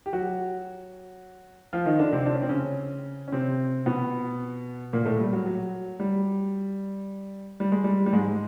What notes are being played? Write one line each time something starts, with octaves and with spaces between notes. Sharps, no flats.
G4
F#3 F#4
F3 F4
D#3 D#4
D3 D4
C3 C4
D4
C#4
C4
C#3 C#4
C#4
C3 C4
B2 B3
A#2 A#3
A2 A3
G3
F#3
F#3
G3
G3
G#3
G3
G3
G#2 G#3